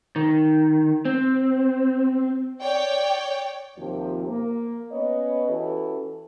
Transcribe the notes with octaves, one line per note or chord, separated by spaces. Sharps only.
D#3
C4
C#5 D5 G5
D#2 C3 F3
A#3
B3 C#4 B4 C#5 D#5
E3 C#4 E4 F#4 G4 A4